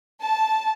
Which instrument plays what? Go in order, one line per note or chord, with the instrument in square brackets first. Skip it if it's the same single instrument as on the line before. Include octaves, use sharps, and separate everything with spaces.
[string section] A5